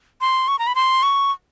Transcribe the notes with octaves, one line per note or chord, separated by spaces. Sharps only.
C6
C#6
A#5
B5
C6
C#6